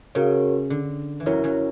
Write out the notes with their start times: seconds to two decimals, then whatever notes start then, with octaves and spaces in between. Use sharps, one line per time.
0.15 C#3 F#4 A#4 C#5
0.70 D3
1.20 E3
1.26 F#2 F#3 E4 A#4 C#5
1.44 F#2 F#3